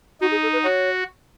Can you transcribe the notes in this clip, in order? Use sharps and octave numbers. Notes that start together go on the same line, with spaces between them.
D#4 F#4
G#4
A4
B4
F#4 C#5